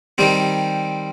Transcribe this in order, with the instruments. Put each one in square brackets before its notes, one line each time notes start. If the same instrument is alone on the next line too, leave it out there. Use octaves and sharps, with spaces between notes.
[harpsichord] D#3 G3 C4